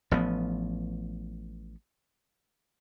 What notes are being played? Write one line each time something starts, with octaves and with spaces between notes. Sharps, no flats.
A1 F3 B3